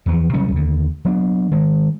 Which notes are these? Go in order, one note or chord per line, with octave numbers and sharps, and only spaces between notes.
E2 E3 F3
C3 F#3 G3 C#4
D#2 D3
F#3 B3 D4
D#3 G#3